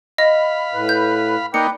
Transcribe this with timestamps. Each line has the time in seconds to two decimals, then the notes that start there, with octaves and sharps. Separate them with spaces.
0.18 D#5 F5 B5
0.74 A2 B4
0.89 G6
1.54 A#3 D#4 B4 D5 G5 C#7